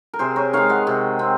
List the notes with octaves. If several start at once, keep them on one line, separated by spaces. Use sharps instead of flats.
A#4
C3 G#4 C5
A#4 C#5
D#3 G#3 C#5 F5
D#5 F#5
C3
C4